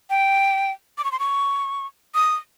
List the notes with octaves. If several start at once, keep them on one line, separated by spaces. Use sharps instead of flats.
G5
D6
C#6
C6
C#6
D#6